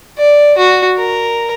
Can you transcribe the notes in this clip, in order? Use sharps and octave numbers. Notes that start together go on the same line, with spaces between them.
D5
F#4
A#4